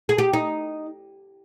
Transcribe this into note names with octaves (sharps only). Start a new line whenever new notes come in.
G#4
G4
D#4